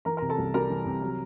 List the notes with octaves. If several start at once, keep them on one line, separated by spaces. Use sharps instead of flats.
E3 A#4 A#5
A#4 A#5
C3
A4 A5
C2
G3 A#4 A#5
E3
C3
F#3